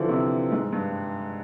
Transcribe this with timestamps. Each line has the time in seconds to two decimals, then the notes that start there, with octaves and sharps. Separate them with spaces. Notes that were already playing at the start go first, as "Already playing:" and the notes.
Already playing: D3 E3 F3
0.09 C3
0.52 G#2
0.72 G2